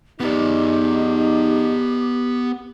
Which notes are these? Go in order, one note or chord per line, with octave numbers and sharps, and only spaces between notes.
F3 G#3 B3 D#4 G4 D5